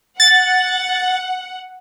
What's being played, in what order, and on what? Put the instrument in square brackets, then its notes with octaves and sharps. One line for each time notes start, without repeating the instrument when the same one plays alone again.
[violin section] F#5 [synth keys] A6